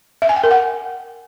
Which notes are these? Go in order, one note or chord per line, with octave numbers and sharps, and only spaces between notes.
E5
G#5
G5
A#4
F#5